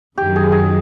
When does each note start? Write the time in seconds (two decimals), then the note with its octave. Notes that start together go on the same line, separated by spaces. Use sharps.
0.18 F#2 D#3 F#3 G4
0.36 G#4
0.52 G#4